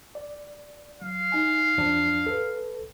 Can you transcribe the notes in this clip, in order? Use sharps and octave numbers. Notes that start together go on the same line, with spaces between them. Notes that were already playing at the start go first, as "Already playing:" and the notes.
D5
F#3 F5
D#4 G#5
F2 F3 D4
A4 B4